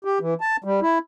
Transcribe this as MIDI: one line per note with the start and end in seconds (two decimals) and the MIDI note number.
0.05 0.19 67
0.21 0.34 52
0.41 0.56 81
0.64 0.80 55
0.82 0.98 64